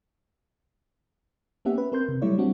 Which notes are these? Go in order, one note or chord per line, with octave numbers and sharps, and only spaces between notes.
A#3 B3 C#4 G4 E5 F#5
B4
C4 A#4 C6 G6
C3
F#3 G3 A3 E4 C#5 D5
G3 C4 D4 F#4